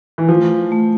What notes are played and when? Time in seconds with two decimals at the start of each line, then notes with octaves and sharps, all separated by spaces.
0.18 E3
0.28 F3 A3
0.72 A3